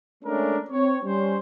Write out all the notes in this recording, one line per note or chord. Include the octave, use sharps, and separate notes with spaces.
G#3 A3 C#4 D4 A4 A#4
C4 C#5
G3 C#4 C5